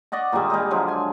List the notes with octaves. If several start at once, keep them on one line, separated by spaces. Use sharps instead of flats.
D5 D#5 F#5 C#6
A#2 D#3 G3 G#3
G3 G#3 D#4 G#4
D3 F3 F#3 G#3
G#5